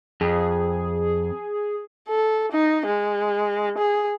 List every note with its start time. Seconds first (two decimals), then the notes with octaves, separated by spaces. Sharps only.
0.21 F2 G#4
2.09 A4
2.52 D#4
2.86 G#3
3.78 G#4